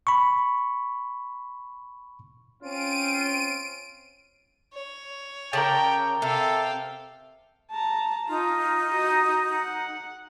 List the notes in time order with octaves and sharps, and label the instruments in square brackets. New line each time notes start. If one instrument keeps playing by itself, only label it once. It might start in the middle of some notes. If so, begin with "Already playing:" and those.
[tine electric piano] B5 C#6
[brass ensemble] C4 C#4 F4 [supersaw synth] D7 D#7
[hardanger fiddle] C#5
[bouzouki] C#3 [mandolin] A#4 D5 A5 [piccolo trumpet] G5
[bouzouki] C3 [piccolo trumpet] A4 [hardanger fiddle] F5 G5
[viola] A5 A#5
[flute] D#4 [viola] F4
[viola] F#4 D#5
F#5